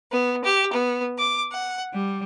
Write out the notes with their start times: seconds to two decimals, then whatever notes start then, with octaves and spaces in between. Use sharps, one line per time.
0.10 B3
0.44 G4
0.72 B3
1.19 D6
1.51 F#5
1.93 G3